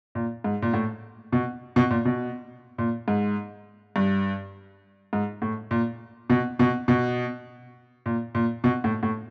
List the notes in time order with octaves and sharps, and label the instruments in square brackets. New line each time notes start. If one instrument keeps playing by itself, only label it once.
[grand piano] A#2
G#2
A#2
A2
B2
B2
A#2
B2
A#2
G#2
G2
G#2
A2
A#2
B2
B2
B2
A#2
A#2
B2
A2
A2